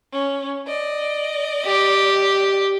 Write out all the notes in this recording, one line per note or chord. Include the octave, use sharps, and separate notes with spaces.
C#4
D5 D#5
G4